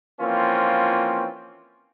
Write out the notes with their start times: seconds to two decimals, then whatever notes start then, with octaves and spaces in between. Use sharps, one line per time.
0.21 E3 F3 A#3 C4 C#4 F4